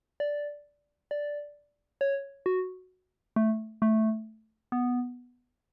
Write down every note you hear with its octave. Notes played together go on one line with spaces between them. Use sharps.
D5
D5
C#5
F#4
A3
A3
B3